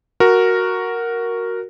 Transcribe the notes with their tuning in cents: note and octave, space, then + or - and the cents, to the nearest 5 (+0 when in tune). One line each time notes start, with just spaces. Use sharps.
F#4 +0 A#4 +0